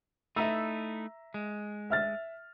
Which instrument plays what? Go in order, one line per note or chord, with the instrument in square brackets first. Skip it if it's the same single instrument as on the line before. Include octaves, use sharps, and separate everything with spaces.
[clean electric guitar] A3 D#4 E4 [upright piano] E5 A#5 E6
[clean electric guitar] G#3
[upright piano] E5 F6 A6